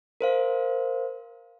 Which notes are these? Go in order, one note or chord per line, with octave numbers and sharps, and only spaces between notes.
A#4 C5 F5